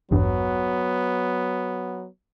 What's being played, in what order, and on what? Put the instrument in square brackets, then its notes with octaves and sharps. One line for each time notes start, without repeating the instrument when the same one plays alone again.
[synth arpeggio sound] A1 E2 G2 [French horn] F#3 [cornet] B3